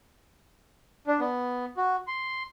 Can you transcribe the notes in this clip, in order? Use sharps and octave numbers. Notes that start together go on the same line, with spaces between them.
D4
B3
F#4
C6